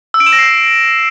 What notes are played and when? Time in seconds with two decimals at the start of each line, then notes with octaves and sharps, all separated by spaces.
0.14 E6
0.20 D7
0.26 E7
0.33 A#6
0.39 C7